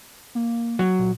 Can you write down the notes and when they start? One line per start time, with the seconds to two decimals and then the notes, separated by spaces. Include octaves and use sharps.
0.35 A#3
0.79 F#3
0.99 A#2